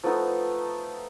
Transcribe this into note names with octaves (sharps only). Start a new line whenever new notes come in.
F3 A3 B3 D#4